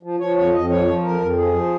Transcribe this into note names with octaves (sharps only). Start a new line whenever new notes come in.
F3
F3 C#5
F2 C#5
F2 D#5
F3 C#5
F3
F2 A#4
F2
F3 G#4
F3